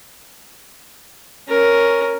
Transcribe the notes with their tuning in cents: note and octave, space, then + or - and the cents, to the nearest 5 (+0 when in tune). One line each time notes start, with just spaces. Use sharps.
C#4 +0 A#4 +0